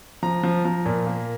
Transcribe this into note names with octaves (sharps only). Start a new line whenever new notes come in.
F3 A#5
F3
F3 A#5
A#2
A#3